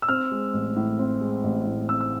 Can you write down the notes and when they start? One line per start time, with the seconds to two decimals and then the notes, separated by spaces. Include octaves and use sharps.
0.02 E6
0.09 C4 F6
0.31 G#3
0.54 A1
0.76 A2
0.99 C4
1.21 G#3
1.44 A1
1.66 A2
1.89 C4 E6
2.01 E6